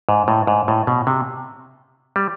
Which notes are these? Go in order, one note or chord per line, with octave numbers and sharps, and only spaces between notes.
G#2
A2
G#2
A2
B2
C3
G3